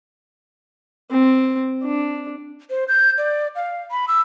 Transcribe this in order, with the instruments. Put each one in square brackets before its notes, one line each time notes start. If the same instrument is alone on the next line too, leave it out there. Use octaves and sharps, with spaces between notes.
[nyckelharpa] C4
D4
[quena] C5
G6
D5
F5
B5
E6